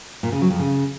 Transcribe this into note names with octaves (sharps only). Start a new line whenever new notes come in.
A#2
C#3
F#3
F2
C#3